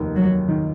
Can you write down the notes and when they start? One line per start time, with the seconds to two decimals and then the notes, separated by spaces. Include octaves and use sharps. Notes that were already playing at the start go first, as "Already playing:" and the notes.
Already playing: F1 D#2 D#3
0.15 F#3
0.48 D#3